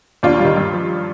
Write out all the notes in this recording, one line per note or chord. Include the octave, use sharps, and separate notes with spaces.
D#2 D4 F4
G3
D#3
G2
F3